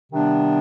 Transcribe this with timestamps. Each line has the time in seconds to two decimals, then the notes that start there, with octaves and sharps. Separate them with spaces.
0.11 C3 D#3 G3 B3 D4